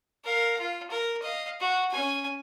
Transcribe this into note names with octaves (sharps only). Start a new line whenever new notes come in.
A#4 F5
F4
A#4
D#5 F5
F#4
C#4 G#5